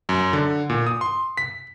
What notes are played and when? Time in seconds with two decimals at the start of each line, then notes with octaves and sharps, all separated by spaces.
0.09 F#2
0.33 D3
0.70 A#2
0.87 D#6
1.01 C6
1.37 B6